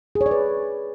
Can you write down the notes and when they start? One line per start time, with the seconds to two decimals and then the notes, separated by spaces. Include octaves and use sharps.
0.15 G#4
0.21 C#5
0.26 D5
0.31 B4